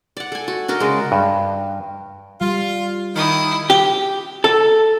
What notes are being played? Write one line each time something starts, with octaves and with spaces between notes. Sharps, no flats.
D5 F#5
A4 G#5
F#4
D4 F#4 A#4 D#5
C#3 G#3
G2
G3 F4
D#3 E4 D#6
G4
A4